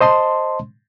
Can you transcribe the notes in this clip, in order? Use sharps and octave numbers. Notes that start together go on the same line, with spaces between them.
C5 D#5 A5 C6